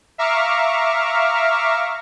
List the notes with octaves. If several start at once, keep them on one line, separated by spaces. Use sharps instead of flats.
E5 F5 A#5 C#6 D6 F6